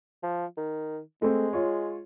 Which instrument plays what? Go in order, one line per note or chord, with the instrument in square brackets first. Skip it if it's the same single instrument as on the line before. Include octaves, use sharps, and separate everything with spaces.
[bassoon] F3
D#3
[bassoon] G#3 [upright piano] A3 C4
[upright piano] F4 C#5